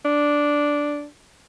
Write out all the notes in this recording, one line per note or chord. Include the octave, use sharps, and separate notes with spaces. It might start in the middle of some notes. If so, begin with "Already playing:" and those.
D4